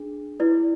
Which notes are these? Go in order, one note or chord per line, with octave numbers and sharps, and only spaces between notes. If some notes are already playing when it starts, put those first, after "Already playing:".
Already playing: D4 G#4
E4 B4 D5